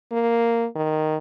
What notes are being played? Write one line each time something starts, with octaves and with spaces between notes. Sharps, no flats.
A#3
D#3